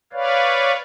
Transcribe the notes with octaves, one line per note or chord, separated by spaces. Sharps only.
B4 C#5 D5 F5